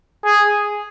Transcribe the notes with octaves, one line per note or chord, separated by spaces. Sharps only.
G#4